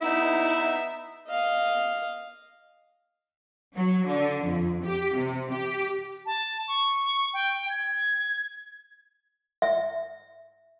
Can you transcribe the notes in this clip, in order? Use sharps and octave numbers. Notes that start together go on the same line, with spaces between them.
B3 D#4 E4 E5
D#5 F5
F#3
D3
F2
G4
C3
G4
A5
C#6
G5
G#6
E5